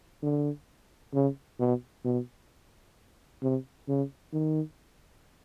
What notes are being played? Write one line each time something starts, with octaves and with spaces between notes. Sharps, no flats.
D3
C#3
B2
B2
C3
C#3
D#3